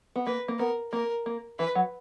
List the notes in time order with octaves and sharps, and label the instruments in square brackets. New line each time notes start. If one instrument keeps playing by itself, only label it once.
[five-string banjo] B3
[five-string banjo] A#3 [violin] B4
[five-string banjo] A#3
[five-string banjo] B3 [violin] A#4
[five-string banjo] A#3 [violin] A#4
[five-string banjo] A#3
[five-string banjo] E3 [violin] B4
[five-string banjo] F#3